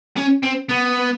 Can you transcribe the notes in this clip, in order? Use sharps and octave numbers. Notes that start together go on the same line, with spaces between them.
C#4
C4
B3